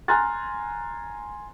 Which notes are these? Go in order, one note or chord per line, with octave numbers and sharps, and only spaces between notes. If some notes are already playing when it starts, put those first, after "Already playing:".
G#5 A#5 C6 F6 F#6 A6